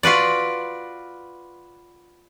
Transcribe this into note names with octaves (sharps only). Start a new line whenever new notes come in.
F4 F#4 B4 D5